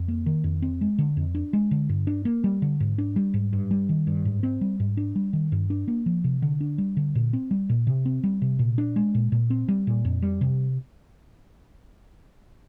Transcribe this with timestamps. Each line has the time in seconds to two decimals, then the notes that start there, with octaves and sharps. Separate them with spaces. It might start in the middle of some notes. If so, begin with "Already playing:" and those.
Already playing: F2
0.08 A#3
0.26 D#3
0.44 F2
0.62 C4
0.81 G#3
0.98 D3
1.17 F2
1.35 D4
1.53 G#3
1.71 D3
1.89 G2
2.07 D4
2.25 A#3
2.44 G3
2.62 D3
2.80 G#2
2.98 D4
3.16 G3
3.34 G#2
3.53 G2
3.71 G3
3.89 D#3
4.07 G2
4.25 G#2
4.43 C4
4.61 G3
4.80 G#2
4.97 D4
5.16 G3
5.33 D#3
5.52 G2
5.70 D4
5.88 A#3
6.06 F3
6.24 C3
6.42 D3
6.61 D4
6.78 G3
6.97 D3
7.15 A#2
7.33 C4
7.51 G3
7.69 A#2
7.87 C3
8.05 C4
8.24 G3
8.42 C3
8.59 A#2
8.78 D4
8.96 G#3
9.15 A#2
9.32 A#2
9.50 C4
9.68 G3
9.87 A#2
10.05 F2
10.22 G3
10.41 C3